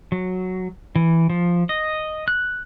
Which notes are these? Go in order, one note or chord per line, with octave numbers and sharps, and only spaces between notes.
F#3
E3
F3
D#5
F#6